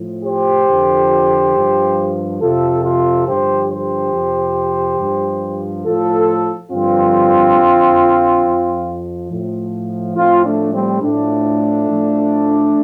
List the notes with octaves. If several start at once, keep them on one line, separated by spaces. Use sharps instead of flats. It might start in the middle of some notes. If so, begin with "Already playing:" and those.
Already playing: A2 F3
G4 C5
F2 D3 F3
G2 F3
F2 C3 F3 F4 A4
F4 A4
G2 D3 F3 G4 C5
G4 C5
F2 C3 F3
G2 F3
A2 F3 F4 A4
G2 D3 F3 C4 F4
F2 D3 F3
F2 F3
A2 F3
A2 F3 C4 F4
A3 D4
G3 C4
A2 F3 A3 D4
A2 F3